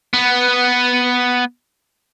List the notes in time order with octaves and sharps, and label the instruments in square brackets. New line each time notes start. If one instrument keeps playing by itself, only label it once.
[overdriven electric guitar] B3